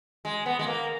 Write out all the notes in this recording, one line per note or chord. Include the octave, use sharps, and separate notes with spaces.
G#3
B3
G#3
A#3